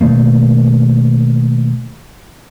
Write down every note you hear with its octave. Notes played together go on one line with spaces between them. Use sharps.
B2 D#3 A3 A#3